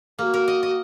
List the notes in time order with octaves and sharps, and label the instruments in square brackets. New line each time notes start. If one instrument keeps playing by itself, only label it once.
[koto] A#3 [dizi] F#4 G#4
[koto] A#4
D#5
D#5